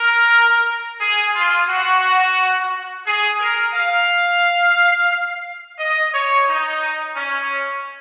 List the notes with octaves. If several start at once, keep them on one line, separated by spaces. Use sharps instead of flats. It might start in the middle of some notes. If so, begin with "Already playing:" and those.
Already playing: A#4
G#4
F4
F#4
G#4
A#4
F5
D#5
C#5
D#4
C#4